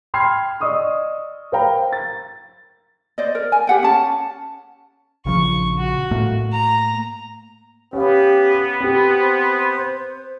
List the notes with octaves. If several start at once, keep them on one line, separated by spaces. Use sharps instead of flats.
G5 B5 C6 F6 G#6 C7
D5 D#5 C#6 D#6 E6
A#4 C5 F5 G5 A#5 B5
A6
C5 D5 D#5
A#4
G#5
G4 F#5 G5
C#4 A5
A#1 C#3 F3 C#6
F#4
A2 A3 A#3
A#5
B3 C#4 G4 F5
C4 G4 C5